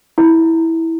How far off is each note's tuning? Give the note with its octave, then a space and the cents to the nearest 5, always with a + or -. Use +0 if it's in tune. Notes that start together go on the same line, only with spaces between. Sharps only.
E4 -15